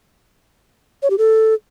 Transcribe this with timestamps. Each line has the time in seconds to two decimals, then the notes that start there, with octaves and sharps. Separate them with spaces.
1.03 C#5
1.10 G4
1.18 A4